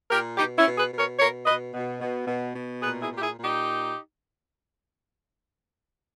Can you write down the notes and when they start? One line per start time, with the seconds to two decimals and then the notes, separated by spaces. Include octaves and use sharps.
0.10 A#2 G4 A#4
0.38 B2 D#4 G4
0.57 C#4 E4
0.64 B2
0.78 G#4 B4
0.91 B2
0.99 A#4 C#5
1.19 B2 A#4 C#5
1.46 B2 B4 D#5
1.74 B2
2.01 B2
2.27 B2
2.55 B2
2.82 A#2 G#4 B4
3.02 E4 G#4
3.09 A#2
3.16 G4
3.22 E4 G#4
3.36 A#2
3.43 D#4 G4